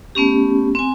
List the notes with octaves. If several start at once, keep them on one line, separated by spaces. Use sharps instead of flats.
A3 B3 C#4 G4
C4 G#5